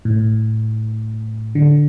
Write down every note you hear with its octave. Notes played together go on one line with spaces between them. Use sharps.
A2
D3